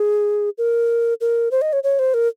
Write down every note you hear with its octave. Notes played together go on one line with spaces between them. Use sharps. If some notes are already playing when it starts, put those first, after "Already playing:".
Already playing: G#4
A#4
A#4
C5
D#5
C#5
C#5
C5
A#4